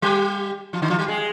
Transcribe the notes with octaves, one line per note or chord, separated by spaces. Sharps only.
G3 G4
F3 F4
D#3 D#4
F3 F4
G3 G4
G#3 G#4